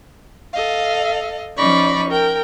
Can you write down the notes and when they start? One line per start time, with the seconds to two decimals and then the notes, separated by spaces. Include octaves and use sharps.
0.54 A4 D#5 F5
1.56 F3 C#4 D#4 D5 B5 C#6
2.09 A#4 G5